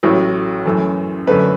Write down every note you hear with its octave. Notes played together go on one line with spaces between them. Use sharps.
A1 A2 F#3
F#2 E3 A3
F#2 D3 A3 B4